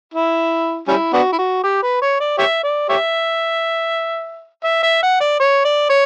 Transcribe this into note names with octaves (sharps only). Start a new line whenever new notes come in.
E4
G3 C#4 E4
B3 D4 F#4
E4
F#4
G4
B4
C#5
D5
G4 C#5 E5
D5
G4 C#5 E5
E5
E5
F#5
D5
C#5
D5
C#5